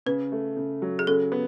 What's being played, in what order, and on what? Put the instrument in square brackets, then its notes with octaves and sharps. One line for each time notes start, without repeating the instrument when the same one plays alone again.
[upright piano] C#3 [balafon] B4
[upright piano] A3
C#3
F#3
[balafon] G#4
[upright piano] C#3 [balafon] A4
[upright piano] B3